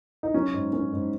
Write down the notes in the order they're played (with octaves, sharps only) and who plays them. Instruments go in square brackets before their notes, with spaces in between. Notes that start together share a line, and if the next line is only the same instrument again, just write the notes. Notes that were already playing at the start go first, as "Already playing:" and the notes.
[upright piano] D#4
F#3 C#4
G#2
C#4
G#2